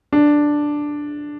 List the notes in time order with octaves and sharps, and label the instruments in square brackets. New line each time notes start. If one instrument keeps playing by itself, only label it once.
[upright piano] D4